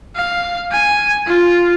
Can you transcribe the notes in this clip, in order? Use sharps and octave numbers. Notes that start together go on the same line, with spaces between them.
F5
G#5
F4